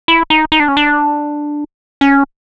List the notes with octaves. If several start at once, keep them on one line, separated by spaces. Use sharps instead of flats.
E4
D#4
D#4
D4
C#4
D4
C#4